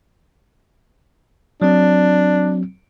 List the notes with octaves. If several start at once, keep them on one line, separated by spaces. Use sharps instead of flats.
F#3 C4 D4